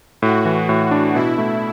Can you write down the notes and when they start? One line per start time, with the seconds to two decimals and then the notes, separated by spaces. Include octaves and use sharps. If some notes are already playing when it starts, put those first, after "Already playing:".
0.22 A2 F#4
0.45 E3
0.69 A2
0.91 D4
1.15 B2 E4
1.38 A3